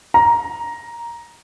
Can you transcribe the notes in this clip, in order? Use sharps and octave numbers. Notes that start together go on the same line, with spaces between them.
A#5